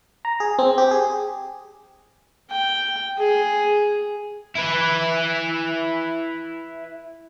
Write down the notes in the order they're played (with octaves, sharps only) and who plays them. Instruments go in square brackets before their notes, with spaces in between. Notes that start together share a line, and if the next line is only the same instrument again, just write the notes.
[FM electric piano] A#5
G#4
C4
G4
G#4
[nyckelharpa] G5
G#4
[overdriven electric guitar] E4 B4